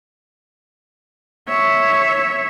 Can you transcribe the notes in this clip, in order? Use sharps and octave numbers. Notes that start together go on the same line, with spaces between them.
C#5 E5